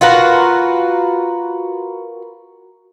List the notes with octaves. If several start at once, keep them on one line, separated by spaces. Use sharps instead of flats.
F4 F#4 A#4 B4